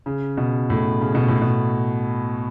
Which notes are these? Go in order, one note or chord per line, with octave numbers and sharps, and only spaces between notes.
C#3
B2
A2
C#3
B2
A2
B2